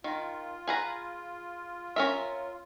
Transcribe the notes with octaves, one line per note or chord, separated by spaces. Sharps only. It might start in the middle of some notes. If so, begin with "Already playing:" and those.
D#3 F4
G#4 B4 A#5
C#4 A#4 E5